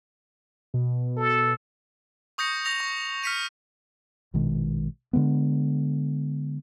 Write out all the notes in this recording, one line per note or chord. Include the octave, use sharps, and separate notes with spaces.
B2
A4
C#6 D#6 G6 A#6 C#7
D#6 A#6 F7
C#6
F6 A#6 B6 C#7 D#7 F7
A#1 B2 D#3 G#3
D3 E3 G#3 B3